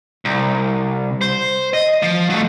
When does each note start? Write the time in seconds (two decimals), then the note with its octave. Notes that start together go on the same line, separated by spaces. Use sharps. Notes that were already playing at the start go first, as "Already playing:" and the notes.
0.25 C2
1.21 C5
1.73 D#5
2.02 F3
2.30 F#3 A3